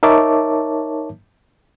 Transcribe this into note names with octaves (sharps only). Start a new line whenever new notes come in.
D#4 A#4 C#5 E5 A5 D6